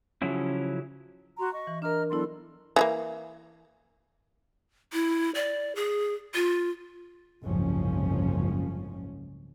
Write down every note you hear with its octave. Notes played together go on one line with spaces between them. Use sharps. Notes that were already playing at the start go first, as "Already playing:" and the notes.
C#3 F3 F#3 C#4 E4
F#4 A#5 C6
D#5 C#6
E3
D4 A#4 D#5 A#5 F6
F#3 B3 D4 E4 A4 C6
E3 F3 A#3
E4
D5
G#4
F4
F#1 C2 G#2 F3 C#4